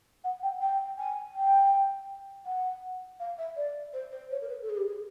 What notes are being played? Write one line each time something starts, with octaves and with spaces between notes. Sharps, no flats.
F#5
G5
G5
G#5
G5
F#5
F5
E5
D5
C5
C5
C#5
A#4
B4
A4
G#4
G4
G#4